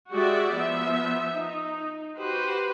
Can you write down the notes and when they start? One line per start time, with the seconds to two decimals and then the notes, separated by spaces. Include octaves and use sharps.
0.12 G#3 F#4 G4 D5 E5
0.55 F3 B3 E5
1.37 D#4
2.18 F#4 G4 B4 C5